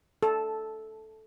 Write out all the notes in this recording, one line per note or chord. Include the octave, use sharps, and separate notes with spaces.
A4